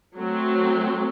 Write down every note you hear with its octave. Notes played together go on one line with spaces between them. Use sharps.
F#3 A3 C4